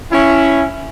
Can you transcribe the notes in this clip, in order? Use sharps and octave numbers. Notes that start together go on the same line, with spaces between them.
C#4 E4